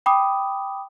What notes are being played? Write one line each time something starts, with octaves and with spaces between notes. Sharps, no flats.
G5 B5 D6 D#6